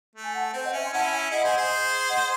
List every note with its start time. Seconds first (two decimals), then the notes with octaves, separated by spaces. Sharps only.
0.16 A3
0.24 G#5
0.34 F#5 A5
0.53 C4 C5
0.63 D#5 F#5
0.73 C#4 E5 G#5
0.83 G#5 C6
0.92 C#4 E4 F#5 A5
1.12 E5 G#5
1.31 E4 G#4 D#5 F#5
1.44 G#4 C5
1.57 G#4 C5
2.08 D#5 F#5